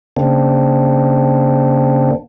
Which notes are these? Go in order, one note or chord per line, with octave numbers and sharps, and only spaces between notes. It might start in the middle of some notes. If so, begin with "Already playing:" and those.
C#3 A#3 C4 D4